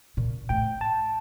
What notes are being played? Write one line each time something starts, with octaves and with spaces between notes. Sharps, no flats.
A#2
A2 G5
A5